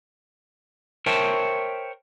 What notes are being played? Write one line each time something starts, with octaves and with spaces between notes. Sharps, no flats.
A#4 C5 C#5 E5 G5 A5